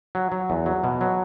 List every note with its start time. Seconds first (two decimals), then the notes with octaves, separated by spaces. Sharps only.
0.15 F#3
0.32 F#3
0.50 E2
0.66 F#3
0.84 B2
1.01 F#3